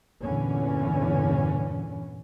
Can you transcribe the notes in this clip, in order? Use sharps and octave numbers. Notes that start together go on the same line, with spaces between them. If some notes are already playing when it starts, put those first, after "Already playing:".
E2 G2 A#2 D3 E3 C#4